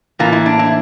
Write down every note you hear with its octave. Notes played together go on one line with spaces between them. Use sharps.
A2 E3 A#3 F4
E4
D4
E4